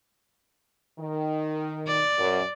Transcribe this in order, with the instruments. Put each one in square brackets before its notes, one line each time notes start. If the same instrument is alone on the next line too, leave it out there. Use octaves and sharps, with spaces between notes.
[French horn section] D#3
[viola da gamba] D5
[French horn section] F#2